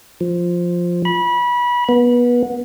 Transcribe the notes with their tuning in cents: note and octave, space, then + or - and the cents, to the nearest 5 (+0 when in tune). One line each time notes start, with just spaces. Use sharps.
F3 +5
B5 -25
B3 -25